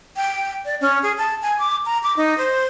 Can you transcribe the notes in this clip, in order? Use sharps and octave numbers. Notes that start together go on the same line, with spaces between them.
G5
D5
C#4
G#4
A5
G#5
D6
A#5
D6
D#4
C5